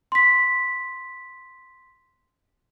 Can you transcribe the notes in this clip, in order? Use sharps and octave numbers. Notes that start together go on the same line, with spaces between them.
C6 B6